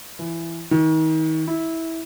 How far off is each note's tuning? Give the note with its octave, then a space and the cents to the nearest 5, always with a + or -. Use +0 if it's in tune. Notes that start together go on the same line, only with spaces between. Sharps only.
E3 +15
D#3 +35
E4 -15